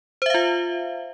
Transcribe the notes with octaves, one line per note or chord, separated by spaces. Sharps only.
F4 C5 E5 F5